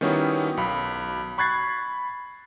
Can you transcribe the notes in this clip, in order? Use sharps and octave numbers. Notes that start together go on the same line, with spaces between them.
D#3 G3 B3 C#4 E4 F#4
B1 B5
B5 C#6 F#6 G#6 A6 C7